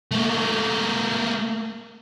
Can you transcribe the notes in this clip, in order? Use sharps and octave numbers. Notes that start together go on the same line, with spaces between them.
A3 A#3